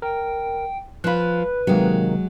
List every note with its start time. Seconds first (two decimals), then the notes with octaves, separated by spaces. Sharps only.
0.02 A#4 G5
1.04 F3 F4 B4 B5 F#6
1.67 C3 D#3 F#3 G#3 A#3